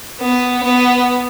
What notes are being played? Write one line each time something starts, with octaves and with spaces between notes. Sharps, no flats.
B3
B3